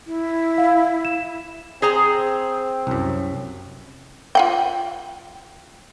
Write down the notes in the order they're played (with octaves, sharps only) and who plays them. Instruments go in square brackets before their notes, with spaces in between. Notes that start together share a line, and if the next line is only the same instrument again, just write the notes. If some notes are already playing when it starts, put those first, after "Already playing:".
[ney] E4
[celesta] F5
E7
[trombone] C4 [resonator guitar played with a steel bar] G#4 C5 A#5
[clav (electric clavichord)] C2 F#2
[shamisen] F4 F#5 G5